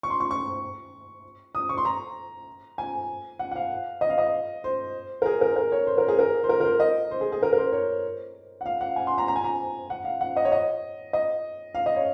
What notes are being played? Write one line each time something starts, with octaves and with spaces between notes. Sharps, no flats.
C#6
C6
C#6
C#6
D#6
C#6
C6
A#5
G#5
F#5
F#5
F5
D#5
F5
D#5
C5
A#4
G#4
A#4
A#4
C#5
C5
A#4
G#4
A#4
C5
A#4
A#4
C5
D#5
C5
G#4
G#4
A#4
A#4
C5
C#5
F#5
F5
F#5
G#5
C6
A#5
A#5
G#5
A#5
F#5
F5
F#5
D#5
C#5
D#5
D#5
F5
D#5
C#5